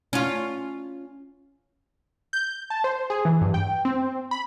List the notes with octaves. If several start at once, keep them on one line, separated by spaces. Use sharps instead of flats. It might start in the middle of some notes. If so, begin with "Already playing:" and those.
C#4 F4
G6
A5
C5
G#4
E3
G2
G5
C4
B5